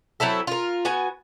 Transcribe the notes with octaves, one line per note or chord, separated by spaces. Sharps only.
F#3 C4 E4 A4
F4 A#4
B3 F#4 G#5